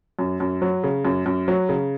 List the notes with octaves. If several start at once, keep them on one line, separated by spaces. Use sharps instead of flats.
F#2
F#2
F#3
C#3
F#2
F#2
F#3
C#3